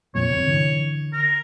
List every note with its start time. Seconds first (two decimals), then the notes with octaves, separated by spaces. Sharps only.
0.15 F2 A#2 C#5
0.30 G1 C3
0.47 D3 E3
1.13 A#4